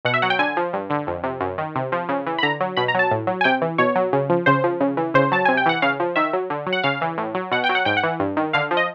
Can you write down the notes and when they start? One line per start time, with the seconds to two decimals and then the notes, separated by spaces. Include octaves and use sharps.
0.05 B2 F#5
0.14 E5
0.22 F#3 F#5
0.30 G5
0.39 D3 G#5
0.57 F3
0.73 G2
0.90 D3
1.07 F2
1.24 C3
1.40 F#2
1.58 D#3
1.76 C3
1.92 F3
2.09 C#3
2.26 E3
2.38 B5
2.43 D3 A#5
2.60 F#3
2.77 B2 B5
2.88 A#5
2.94 F#3 A5
3.11 A2
3.27 F#3
3.41 G#5
3.44 C3 G5
3.62 E3
3.78 B2 C#5
3.96 F#3
4.13 C#3
4.30 F3
4.46 C#3 C5
4.64 F3
4.80 C#3
4.97 E3
5.14 C#3 C5
5.32 F#3 A5
5.45 C3 G#5
5.57 G5
5.66 E3 F#5
5.82 C#3 F5
6.00 F3
6.16 D#3 E5
6.33 F#3
6.50 D3
6.66 F#3
6.73 F#5
6.83 C#3 F5
7.01 E3
7.18 A2
7.35 F#3
7.51 B2 F#5
7.64 G5
7.69 F#3
7.75 F#5
7.85 G#2 G5
7.97 F#5
8.03 E3
8.20 G2
8.37 D#3
8.53 D3 F5
8.71 F3
8.77 D#5